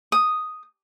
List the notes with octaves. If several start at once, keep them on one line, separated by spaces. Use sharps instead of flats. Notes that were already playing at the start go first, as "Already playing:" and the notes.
D#6